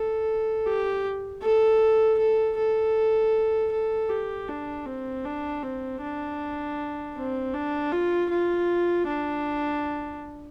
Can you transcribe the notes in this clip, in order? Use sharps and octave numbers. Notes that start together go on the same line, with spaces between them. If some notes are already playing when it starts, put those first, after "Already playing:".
Already playing: A4
G4
A4
A4
A4
A4
G4
D4
C4
D4
C4
D4
C4
D4
F4
F4
D4